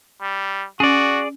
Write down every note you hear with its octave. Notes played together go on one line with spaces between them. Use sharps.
G3
C#4 F#4 G#4 D5